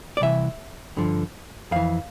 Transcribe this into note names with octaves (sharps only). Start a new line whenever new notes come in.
D5
C2 C3 E3 E5
G2 D3 F3
F2 E3 F5